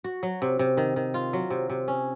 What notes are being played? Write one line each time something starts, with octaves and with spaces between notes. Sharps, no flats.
F#4
F#3
C3
C3
D#3
D#3
F4
F#3
C3
C3
C#4